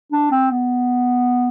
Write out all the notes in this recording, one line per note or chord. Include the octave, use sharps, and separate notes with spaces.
D4
C4
B3